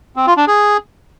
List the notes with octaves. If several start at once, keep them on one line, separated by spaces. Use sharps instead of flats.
C4
F4
D4
G#4